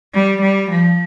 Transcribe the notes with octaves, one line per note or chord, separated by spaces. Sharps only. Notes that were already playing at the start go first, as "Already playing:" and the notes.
G3
G3
F3